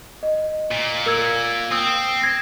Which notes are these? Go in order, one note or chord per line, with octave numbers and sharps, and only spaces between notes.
D#5
A#2
A#4 E6 G#6
C4 D#6 E6
G#6 A#6